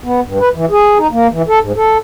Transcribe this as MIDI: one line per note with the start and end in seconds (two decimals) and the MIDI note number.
0.04 0.20 59
0.24 0.39 43
0.40 0.49 71
0.54 0.65 52
0.70 0.98 68
0.98 1.07 63
1.11 1.27 58
1.32 1.42 52
1.48 1.59 69
1.61 1.72 44
1.76 1.98 69